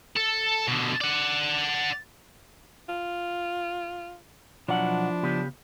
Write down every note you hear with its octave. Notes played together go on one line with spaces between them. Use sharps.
A4
B2 D3
D5 F#5
F4
B1 F3 F#3 D4 E4 F#5
C#3 B3 G4